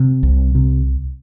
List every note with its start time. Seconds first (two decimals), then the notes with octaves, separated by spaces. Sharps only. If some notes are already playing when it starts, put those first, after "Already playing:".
Already playing: C3
0.23 C2
0.55 C3